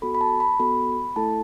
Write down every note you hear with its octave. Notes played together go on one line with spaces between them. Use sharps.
B3 F#4 A4 B5
B5
A5
B5
B3 F#4 A4 B5
A3 E4 A4 A5